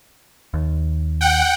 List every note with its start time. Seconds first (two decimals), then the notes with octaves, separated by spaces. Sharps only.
0.54 D#2
1.21 F#5 G5